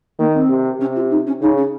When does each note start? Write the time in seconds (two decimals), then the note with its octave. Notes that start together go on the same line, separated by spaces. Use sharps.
0.19 D#3 A#3
0.34 C4
0.49 C3
0.80 C3 C#4
0.95 F4
1.10 D#4
1.26 C#4
1.41 C#3 D#4
1.57 C#4